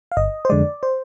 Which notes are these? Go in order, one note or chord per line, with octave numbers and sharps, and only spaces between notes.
F5
G1 D#5
C5
F2 D3 G#3 D5
C5